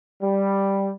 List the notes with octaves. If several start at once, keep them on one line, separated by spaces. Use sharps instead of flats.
G3